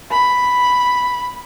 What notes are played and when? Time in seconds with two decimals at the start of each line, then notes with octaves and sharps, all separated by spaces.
0.12 B5